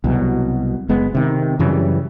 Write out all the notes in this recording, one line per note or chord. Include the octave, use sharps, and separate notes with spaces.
C2 B2 F#3
F#1 G#3 B3
C3 D#3
F#2 C#3 E3 G3